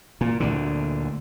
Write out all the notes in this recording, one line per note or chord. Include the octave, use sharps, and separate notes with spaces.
A#2
D2 A#2 D3